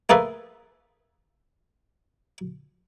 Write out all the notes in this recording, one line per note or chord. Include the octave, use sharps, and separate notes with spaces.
A3 A#3 G#4 A4 B4